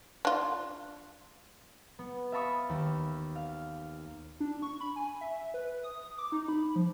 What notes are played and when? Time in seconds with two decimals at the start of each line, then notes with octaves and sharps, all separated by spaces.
0.25 D4 F4
1.99 B3
2.32 E5 F5 A5 B5 C#6 D#6
2.69 D#2
3.36 F5
4.40 D4
4.62 C#6
4.81 B5
4.96 G#5
5.21 E5
5.54 B4
5.83 D#6
6.18 D6
6.32 D#4
6.48 B5
6.76 F3